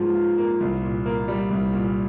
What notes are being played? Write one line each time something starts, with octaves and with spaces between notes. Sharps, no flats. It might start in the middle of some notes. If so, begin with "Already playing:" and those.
Already playing: G#2 F3 A#3 F4
F4
A#3
C2
A#2
A#3
G3
C2
A#2